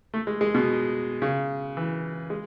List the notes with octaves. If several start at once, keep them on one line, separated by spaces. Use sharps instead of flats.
A3
G#3
G#3
B2
C#3
E3
G#3